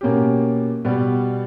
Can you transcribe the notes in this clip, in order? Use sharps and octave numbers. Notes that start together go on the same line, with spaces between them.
B2 A#3 C#4 G4
B2 G3 B3